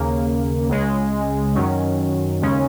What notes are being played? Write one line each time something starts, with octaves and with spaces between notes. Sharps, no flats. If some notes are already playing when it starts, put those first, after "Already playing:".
Already playing: D#2 C#3 A#3
C#2 C#3 G#3
F#2 D#3 F#3 C#4
D#2 C#3 G#3 C#4